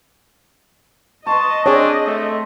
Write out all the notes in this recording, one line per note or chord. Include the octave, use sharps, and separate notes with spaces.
B4 D#5 A5 C6 C#6
C4 D4 G#4 C#5
A3